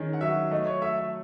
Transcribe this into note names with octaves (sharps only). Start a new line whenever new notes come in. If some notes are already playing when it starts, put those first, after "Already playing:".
Already playing: D#3 C#4 G#4
F#5
F#3 E5
A3 D#5
C#5
A4 E5
E5